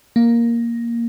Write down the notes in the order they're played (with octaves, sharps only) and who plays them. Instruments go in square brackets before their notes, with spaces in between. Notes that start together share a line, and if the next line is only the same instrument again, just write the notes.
[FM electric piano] A#3